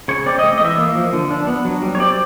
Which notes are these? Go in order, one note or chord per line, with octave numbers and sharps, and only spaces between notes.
C#3 C#5
C4 D5
D#5
A3
D#5
E3 E5
A#3
F3
D3
D4
B3
F#3
G3
C#5
C4 D5